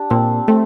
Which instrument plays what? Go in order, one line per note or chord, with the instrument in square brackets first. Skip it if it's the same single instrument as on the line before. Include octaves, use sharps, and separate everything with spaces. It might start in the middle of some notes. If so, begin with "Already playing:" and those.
Already playing: [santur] D4 G4
[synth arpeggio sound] A#2 [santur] C4
[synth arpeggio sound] A3 [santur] C4